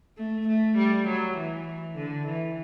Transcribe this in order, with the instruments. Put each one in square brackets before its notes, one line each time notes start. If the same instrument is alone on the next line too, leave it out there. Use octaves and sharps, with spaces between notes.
[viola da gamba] A3
A3
G3
F#3
E3
D3
E3